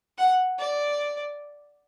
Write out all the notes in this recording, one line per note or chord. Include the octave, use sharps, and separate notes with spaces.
F#5
D5